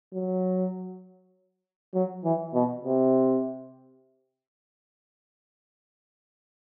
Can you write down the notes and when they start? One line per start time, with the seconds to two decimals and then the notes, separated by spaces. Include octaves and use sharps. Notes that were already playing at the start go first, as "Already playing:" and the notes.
0.14 F#3
1.94 F#3
2.24 E3
2.54 B2
2.85 C3